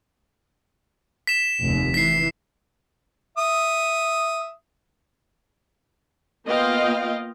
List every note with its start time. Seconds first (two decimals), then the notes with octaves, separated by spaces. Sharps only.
1.27 B6 E7
1.62 F1 D#2
1.94 E3 B6 C7
3.38 E5 D#6
6.45 A#3 B3 F4 D#5 F5 G5